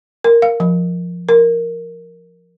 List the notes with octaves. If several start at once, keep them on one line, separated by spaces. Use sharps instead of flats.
A#4
F5
F3
A#4